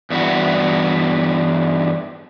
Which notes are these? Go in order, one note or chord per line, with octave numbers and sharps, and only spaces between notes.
E2 G2 E4 F#4